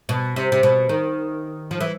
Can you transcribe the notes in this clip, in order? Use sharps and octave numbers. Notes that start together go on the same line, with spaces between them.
B2
C3
C3
B2
D#3
F3
E3